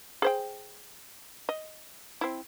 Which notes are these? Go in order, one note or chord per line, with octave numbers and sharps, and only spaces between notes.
G#4 C5 G5
D#5
C4 E4